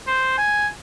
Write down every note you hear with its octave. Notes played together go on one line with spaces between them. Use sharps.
C5
G#5